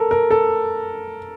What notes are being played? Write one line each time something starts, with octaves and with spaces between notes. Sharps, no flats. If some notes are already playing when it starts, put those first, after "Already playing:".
Already playing: A4 A#4
A#4
A4